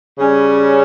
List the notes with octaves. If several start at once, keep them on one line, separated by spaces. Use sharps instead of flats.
C#3 G3 C#4